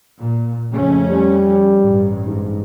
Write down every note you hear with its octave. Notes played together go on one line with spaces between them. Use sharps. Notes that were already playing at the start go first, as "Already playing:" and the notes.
A#2
F2 C#3 A3 C#4
G3
A1 G2
G#2